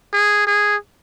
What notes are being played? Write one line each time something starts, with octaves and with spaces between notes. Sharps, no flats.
G#4
G#4